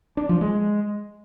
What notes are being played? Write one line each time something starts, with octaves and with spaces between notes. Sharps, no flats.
D4
F3
G#3